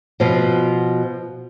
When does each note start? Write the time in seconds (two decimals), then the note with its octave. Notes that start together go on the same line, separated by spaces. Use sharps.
0.20 B2 F3